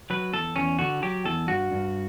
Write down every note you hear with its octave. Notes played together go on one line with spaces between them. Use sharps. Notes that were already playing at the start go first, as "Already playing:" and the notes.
F#3 B4
E2 A4
E2 C#4
D3 F#4
F#3 G4
E2 A4
G2 F#4
G2